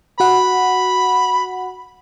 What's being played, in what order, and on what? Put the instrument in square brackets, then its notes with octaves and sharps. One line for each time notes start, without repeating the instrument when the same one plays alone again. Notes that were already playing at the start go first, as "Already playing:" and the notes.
[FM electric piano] F#4 F#5 [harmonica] B5